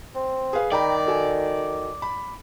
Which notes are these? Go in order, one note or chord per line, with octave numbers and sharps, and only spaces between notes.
C4
G#4 B4 F5
D#3 D5 G5 A#5 B5
F#4 A4 G#5
B5